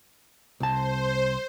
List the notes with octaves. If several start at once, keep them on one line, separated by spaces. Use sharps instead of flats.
C2 C5 A5